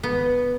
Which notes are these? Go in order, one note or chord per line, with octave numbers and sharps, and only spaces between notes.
B3